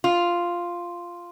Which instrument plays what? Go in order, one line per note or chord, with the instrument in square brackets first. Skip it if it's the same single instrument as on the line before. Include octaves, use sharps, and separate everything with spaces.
[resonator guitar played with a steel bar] F4